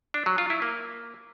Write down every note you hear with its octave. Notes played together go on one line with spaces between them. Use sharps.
D4
F#3
F4
E4
A#3